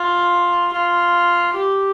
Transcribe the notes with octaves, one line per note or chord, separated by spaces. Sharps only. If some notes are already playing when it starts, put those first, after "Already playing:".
Already playing: F4
F4
G4